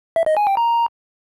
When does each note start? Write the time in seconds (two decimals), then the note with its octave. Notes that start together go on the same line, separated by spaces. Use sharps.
0.16 E5
0.26 D#5
0.37 G#5
0.47 G5
0.57 A#5